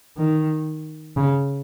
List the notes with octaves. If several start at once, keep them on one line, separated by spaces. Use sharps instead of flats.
D#3
C#3